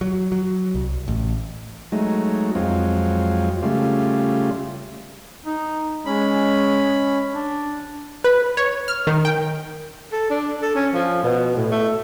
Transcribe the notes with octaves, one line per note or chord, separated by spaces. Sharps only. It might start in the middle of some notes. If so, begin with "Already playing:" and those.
F#3
F#3
C2
A1
F#3 G#3 A3 D#4
F2 F#3 G#3 C4 F4
C#3 G3 A3 F4
D#4
G#3 C#4 B5
D4
B4
C#5
F6
D#3
G5
A4
D4
A4
C#4
F3
B2
A2
A3